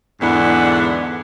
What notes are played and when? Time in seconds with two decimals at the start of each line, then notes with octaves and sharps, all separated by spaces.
0.21 E2 G#2 D3 B3 D4